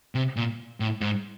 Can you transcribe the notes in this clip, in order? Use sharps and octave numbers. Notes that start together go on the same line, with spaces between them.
C3
A#2
A2
G#2